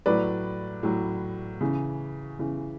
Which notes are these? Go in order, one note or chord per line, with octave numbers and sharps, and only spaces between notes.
A2 F#3 B4 D5
A2 F#3
C#3 E3
C#3 E3